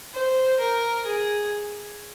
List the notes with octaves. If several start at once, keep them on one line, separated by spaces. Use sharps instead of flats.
C5
A#4
G#4